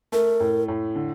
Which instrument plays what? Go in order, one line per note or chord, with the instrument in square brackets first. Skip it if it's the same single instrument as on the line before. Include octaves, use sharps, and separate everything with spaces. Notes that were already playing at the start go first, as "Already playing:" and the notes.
[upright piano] A3 [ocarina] A#4
[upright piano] A2
A2
D3